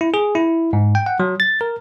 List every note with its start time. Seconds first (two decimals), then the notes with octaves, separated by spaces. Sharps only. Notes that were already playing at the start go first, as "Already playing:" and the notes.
0.01 E4
0.14 G#4
0.35 E4
0.73 G#2
0.95 G5
1.06 F#5
1.20 F#3
1.40 A6
1.61 A#4